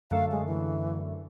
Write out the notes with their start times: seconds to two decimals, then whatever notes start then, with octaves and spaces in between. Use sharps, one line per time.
0.11 F#2 D3 A3 F5
0.31 G#3
0.46 E3